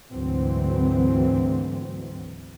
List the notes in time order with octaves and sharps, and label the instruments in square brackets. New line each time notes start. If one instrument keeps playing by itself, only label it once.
[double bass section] D2 G#2 D3 E3 F#3 C4